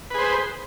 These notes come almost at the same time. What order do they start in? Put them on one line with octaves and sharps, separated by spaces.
B4 G#4 C5